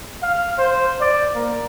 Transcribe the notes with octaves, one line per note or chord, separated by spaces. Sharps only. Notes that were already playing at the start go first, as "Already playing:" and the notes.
F5
C5
D5
A#3